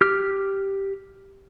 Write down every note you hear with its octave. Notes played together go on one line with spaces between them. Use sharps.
G4 F6